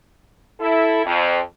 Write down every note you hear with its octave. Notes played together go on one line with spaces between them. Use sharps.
E4 A4
F2